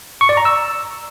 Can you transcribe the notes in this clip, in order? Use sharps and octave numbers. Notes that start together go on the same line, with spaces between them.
C#6
D5
A#5
E6